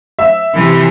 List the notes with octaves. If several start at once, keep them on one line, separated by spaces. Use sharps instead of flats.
E5
C3 E3